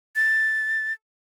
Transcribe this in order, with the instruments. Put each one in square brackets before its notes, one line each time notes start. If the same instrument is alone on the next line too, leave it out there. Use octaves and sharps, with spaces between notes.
[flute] A6